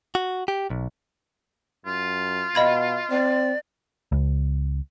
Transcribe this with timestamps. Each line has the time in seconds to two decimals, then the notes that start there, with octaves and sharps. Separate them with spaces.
0.15 F#4
0.48 G4
0.70 B1
1.86 F#2 F4
2.55 B2 D#5 F5 B5 G#6
3.10 C4 D5
4.12 C#2